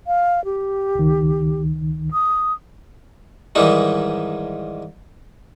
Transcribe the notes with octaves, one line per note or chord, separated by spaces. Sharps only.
F5
G4
C#2 D#3
D#6
G#2 D#3 E3 G3 D#4